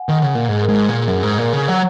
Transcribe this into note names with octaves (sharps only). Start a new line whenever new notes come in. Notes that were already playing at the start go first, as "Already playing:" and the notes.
Already playing: F#5 G#5
D#3
C#3
A#2
G#2 G#4
A#4
G#2 G#4
A#2
F#2
G#2
A#2
C#3
F#3 F#5